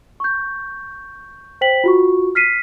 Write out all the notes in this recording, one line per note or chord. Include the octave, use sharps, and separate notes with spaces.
C#6 G6
C5 G5 B6 F#7
F4 F#4 C#6
F6 B6 C7 D#7